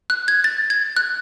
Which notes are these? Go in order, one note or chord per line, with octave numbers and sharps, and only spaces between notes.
F#6
G#6
A6
G#6
F#6